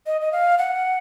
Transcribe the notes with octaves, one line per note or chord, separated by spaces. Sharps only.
D#5
D#5
F5
F#5